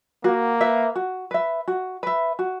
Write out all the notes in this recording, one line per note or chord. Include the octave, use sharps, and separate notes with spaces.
A#3 F#4
B4 E5
F#4
B4 E5
F#4
B4 E5
F#4